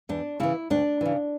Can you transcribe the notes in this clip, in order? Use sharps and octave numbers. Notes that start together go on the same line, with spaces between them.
E2 D4
C#3 E3 E4
D2 D4
C#3 E3